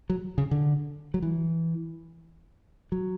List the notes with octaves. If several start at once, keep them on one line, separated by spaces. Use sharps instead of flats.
F#3
C#3
D3
F#3
E3
F#3